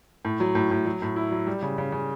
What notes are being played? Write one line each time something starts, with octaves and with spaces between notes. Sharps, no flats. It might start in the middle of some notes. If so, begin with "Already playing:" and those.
A2
F#3
A2
A2
F#3
A2
E4
F#3
G3
C#3
C#3
C#3